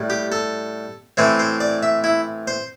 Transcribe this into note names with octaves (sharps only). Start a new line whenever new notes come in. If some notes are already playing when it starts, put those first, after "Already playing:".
Already playing: A2 G3
G4
A4
A2 E3 C4 C5
C5
D5
E5
E4
C5